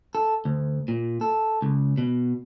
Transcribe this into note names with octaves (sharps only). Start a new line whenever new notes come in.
A4
D2
A#2
A4
C#2
B2